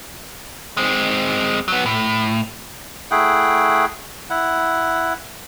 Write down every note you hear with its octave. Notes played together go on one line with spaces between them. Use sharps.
G#3 C4
F#3 B3
A2
A3 E4 G#4 F#5 G5
E4 F#5